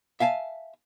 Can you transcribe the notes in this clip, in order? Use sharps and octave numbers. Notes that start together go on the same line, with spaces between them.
E5 F5 G#5 A5